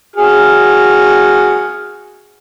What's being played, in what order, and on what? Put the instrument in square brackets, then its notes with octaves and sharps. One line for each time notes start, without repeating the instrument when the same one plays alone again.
[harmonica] F#4 G#4 F6